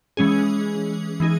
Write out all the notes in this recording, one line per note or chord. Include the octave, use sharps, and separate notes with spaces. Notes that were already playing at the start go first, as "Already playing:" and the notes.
E3 G#3 C#4 G#4
E3 G#3 D#4 G#4